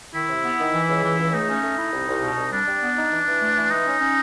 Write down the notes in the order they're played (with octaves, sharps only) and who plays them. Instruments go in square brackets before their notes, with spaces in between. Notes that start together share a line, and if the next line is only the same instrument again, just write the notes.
[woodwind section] D#3 [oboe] E4
[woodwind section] C3
B3
D#3
E3
C#2
E3
C#2
[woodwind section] A3 [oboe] D#4
[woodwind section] C#4
A3
E4
C2
C2
B2
C2
[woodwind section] G3 [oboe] D4
[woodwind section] G3
B3
D#4
E3
E3
A3
E3
[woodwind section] G#3 [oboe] D#4
[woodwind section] C#4
C#4